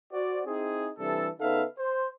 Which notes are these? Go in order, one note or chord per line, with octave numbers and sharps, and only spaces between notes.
F#4 C5 D5
C4 D#4 E4 G#4
C3 E3 G3 D4 A4
C#3 B3 D#4 A4 E5 F5
C5